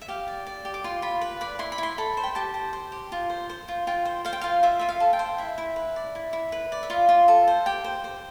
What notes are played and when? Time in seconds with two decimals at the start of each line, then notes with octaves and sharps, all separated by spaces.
0.01 E5
0.08 G4 F5
0.28 D5
0.47 D5
0.65 G4
0.74 D6
0.84 F4 C6
1.02 F4 B5
1.21 B4 B5
1.41 D5 B5
1.59 E4 C6
1.72 B5
1.78 E4 C6
1.98 A4 B5
2.17 C5
2.23 G5
2.35 G4 A5
2.54 C5
2.73 C5
2.92 G4
3.12 F4
3.30 C5
3.49 C5
3.68 F4
3.87 F4 G5
4.05 C5
4.25 C5 F5
4.33 G5
4.41 F4 F5
4.63 F4 E5
4.79 F4 E5
4.89 F5
5.00 A4
5.13 G5
5.19 C5
5.38 E4 E5
5.58 E4
5.76 B4
5.96 D5
6.15 E4
6.33 E4
6.52 B4
6.72 D5
6.83 E5
6.90 F4 F5
7.09 F4
7.28 A4
7.47 C5
7.66 G4 G5
7.84 C5
8.04 C5